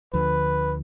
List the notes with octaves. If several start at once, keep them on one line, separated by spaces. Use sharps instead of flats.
D2 D3 F3 B4